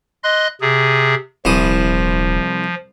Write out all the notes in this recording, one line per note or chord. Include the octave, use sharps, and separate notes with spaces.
D#5 C6 F#6
C3 G#4
D#1 C2 E3 F3 D#6